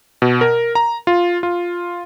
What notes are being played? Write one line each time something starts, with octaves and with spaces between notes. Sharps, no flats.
B2
A#4
A#5
F4
F4